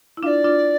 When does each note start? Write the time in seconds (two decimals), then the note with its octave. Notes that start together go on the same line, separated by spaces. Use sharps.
0.17 E4
0.23 D4 F4 F5
0.26 D5
0.44 D4 F4